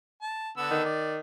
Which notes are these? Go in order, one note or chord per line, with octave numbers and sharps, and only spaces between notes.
A5
D3 B3 E6
D#3
D5